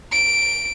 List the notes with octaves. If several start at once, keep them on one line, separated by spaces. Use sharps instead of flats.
D7